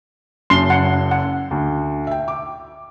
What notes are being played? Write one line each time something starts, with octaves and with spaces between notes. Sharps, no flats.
F#1 F#2 C6
F#5
F#5
D2
E5 G5
D6